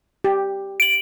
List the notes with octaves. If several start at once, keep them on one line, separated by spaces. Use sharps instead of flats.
G4
D7 F#7